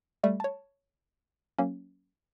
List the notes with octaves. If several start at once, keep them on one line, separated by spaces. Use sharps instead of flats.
G3 A3 E5
C#5 A5
F#3 A#3 C#4